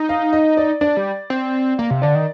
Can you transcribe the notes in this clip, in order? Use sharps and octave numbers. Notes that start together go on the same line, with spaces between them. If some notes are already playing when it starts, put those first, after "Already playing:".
Already playing: D#4
F5
D#5
D5
D4 D5
G3
C4
A#3 F5
C3
D3 D5
D#3